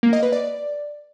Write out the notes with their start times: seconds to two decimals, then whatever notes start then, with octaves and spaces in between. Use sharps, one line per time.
0.03 A#3
0.13 D#5
0.23 B4
0.32 D5